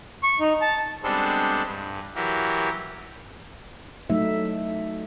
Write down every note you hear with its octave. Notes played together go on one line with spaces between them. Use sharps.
C#6
D#4
A5
G3 G#3 B3 C4 D4 A4
G2
E3 F#3 G4 A#4
F#3 A3 D#4 E5